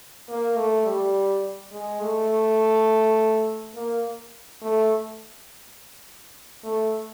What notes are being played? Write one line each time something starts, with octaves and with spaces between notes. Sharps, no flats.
A#3
A3
G3
G#3
A3
A#3
A3
A3